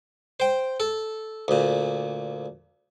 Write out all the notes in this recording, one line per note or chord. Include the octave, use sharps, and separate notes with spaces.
C5 G5
A4
D2 A#2